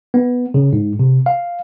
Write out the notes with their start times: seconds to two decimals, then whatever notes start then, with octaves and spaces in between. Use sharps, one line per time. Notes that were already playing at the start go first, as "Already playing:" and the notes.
0.14 B3
0.54 C#3
0.73 G#2
0.99 C3
1.26 F5